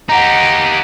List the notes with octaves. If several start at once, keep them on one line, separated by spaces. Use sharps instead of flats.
D#4 G4 F#5 A#5